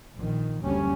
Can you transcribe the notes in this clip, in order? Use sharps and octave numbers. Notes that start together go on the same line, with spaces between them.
A#1 D#3
F#1 D2 G3 C#4